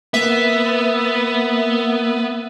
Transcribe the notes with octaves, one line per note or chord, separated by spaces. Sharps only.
A#3 B3 E5